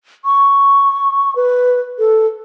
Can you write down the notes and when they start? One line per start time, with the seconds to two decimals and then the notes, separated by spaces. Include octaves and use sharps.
0.25 C#6
1.36 B4
1.99 A4